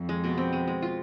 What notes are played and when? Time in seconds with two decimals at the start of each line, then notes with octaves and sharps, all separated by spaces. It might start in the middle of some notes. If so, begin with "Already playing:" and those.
Already playing: F2
0.09 G#3
0.24 B2
0.38 C4
0.53 G#3
0.67 G#3
0.82 F4